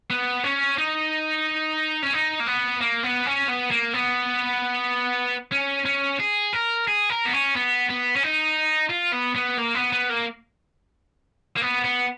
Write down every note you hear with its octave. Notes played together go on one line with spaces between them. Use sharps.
B3
C#4
D#4
C#4
D#4
A#3
B3
A#3
B3
C#4
B3
A#3
B3
C#4
C#4
G#4
A#4
G#4
A#4
B3
C#4
B3
B3
C#4
D#4
F4
B3
B3
A#3
B3
B3
A#3
A#3
B3
B3